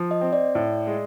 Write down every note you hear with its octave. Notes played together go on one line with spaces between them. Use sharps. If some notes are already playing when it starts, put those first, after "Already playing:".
Already playing: F3
D#5
C4
D5
A2
G#3